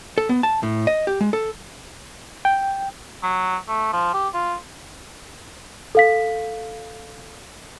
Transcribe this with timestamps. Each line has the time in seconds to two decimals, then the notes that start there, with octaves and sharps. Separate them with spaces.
0.18 A4
0.29 B3
0.43 A5
0.63 A2
0.87 D#5
1.07 G4
1.21 G#3
1.33 A4
2.45 G5
3.23 F#3
3.68 A3
3.93 F3
4.14 G4
4.34 F4
5.95 A4 F5 B6